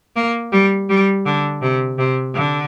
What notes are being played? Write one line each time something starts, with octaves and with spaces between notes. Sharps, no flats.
A#3
G3
G3
D3
C3
C3
D3